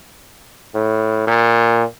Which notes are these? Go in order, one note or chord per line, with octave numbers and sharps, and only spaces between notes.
A2
A#2